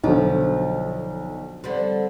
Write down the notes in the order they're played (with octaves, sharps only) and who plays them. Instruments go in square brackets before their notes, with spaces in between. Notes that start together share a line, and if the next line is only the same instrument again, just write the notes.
[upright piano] B1 D3 [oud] F3
[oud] D3 G3 C4